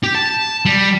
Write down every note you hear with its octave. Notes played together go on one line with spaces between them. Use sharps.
G4
A5
G3